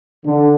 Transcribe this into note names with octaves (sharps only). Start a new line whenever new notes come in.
D3